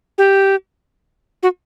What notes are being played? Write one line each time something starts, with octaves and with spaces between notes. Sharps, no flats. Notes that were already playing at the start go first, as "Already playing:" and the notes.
G4
F#4